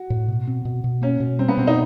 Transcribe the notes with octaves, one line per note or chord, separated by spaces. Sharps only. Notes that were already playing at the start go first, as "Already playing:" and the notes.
Already playing: F#4
A2
B2
C4
B2
B2
A#3 C#4
B2
G3 C4
B3
B2 C4
D#4